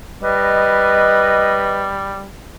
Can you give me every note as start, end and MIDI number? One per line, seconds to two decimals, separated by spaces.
0.23 2.26 55
0.23 1.91 71
0.23 1.91 75